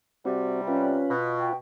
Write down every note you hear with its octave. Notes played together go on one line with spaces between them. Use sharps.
C3 G3 C4 F#4
C#4 F4 B4
B2
G5